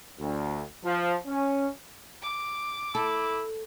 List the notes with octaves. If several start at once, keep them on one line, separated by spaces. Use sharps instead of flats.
D2
F3
C#4
D6
E4 A4